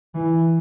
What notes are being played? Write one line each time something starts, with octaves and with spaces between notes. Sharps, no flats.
E3